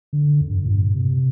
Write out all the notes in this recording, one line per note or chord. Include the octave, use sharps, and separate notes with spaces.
D3
F2
G2
A#2
G2
C3